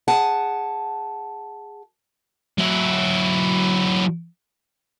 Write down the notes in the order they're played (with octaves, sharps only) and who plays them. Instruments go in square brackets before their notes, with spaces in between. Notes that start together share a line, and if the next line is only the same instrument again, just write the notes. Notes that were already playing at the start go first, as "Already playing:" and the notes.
[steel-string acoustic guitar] G#4 F#5 A5
[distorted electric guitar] F#3 E4